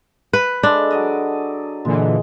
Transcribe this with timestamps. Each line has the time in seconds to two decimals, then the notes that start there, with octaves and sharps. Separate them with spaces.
0.33 B4
0.63 G#3 D4 A4 E5
0.91 F#3 D5 D#5
1.85 A#2 D3 E3 G#3